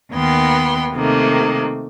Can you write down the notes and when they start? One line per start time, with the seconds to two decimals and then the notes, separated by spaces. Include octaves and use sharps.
0.12 D#2 D#3 B3 G5 C6
0.93 C3 D#3 A3 A#3